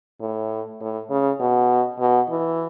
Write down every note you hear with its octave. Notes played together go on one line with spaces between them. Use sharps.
A2
A2
C#3
B2
B2
E3